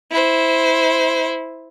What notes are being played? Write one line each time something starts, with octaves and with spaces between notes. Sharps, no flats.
E4 C5